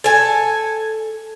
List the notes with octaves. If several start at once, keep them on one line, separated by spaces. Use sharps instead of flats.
A4 G#5